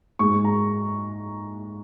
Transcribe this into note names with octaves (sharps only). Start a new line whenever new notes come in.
G#2 G#3 C#6
A#5